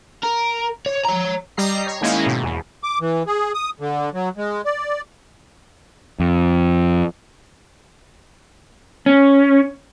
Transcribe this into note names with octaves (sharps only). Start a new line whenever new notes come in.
A#4
C#5
C#5 A#5
G3 G4 D#5 A#5 C7
C#5
D#3 G#3 A#3 C#4 D#4 E4
G#2 B2
E2
D6
E3
G#4
D#6
D3
F#3
G#3
D5
F2
C#4